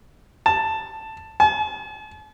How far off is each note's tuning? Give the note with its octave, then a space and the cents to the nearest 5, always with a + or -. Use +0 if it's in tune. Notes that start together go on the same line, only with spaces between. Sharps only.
A5 +5
A5 -45